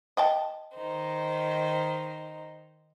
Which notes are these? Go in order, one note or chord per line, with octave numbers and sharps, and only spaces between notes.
D#5 G5 A5
D#3 D#4 C5